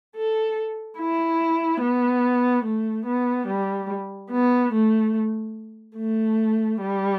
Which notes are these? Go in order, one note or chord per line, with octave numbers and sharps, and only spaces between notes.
A4
E4
B3
A3
B3
G3
B3
A3
A3
G3